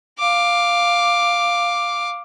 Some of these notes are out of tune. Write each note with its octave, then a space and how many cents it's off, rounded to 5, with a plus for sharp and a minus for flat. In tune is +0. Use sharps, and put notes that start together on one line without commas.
F5 +0 D6 +5